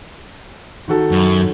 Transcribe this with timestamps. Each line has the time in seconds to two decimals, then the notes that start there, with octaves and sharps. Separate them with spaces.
0.88 D#3 F#4 A4
1.11 F#2